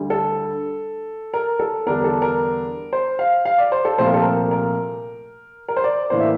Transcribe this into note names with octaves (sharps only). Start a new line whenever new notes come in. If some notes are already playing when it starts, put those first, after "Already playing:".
Already playing: D2 D3 G3
A4
A#4
A4
E2 D3 G3 D4 A#4
A4
A#4
C5
F5
F5
D5
C5
A4
C2 A#2 F3 A3 C5
A#4
A4
A#4
A#4
A#4
C5
D5
A2 E3 A#3 D4 C5
E5